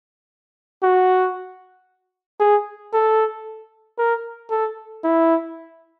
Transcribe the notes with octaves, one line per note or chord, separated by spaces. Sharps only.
F#4
G#4
A4
A#4
A4
E4